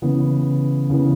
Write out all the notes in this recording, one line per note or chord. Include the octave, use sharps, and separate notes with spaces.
C#3 E3 B3
C#3 E3 B3